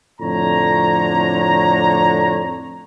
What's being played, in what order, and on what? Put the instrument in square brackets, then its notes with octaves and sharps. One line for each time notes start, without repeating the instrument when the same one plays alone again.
[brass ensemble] F2 A2 D3 C#5 A#5